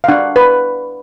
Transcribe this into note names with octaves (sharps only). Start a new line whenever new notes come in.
F5
D4 F#5
B4